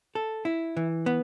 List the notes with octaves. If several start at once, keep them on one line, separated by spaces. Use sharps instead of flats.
A4
E4
E3
B3